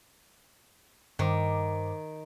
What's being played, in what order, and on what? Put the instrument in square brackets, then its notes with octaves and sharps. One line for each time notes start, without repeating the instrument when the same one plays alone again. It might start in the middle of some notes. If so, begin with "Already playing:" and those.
[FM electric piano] G2 C5 D6 [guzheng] D#3